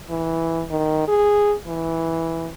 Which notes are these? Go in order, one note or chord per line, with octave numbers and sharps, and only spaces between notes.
E3
D#3
G#4
E3